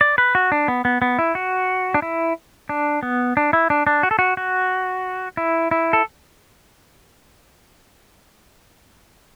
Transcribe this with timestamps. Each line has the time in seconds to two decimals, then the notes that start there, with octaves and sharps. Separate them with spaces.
0.01 D5
0.18 B4
0.35 F#4
0.52 D4
0.68 B3
0.85 B3
1.02 B3
1.19 E4
1.35 F#4
1.94 D4
2.02 E4
2.69 D4
3.03 B3
3.37 D4
3.53 E4
3.70 D4
3.87 D4
4.03 F#4
4.11 A4
4.19 F#4
4.37 F#4
5.37 E4
5.71 E4
5.93 A4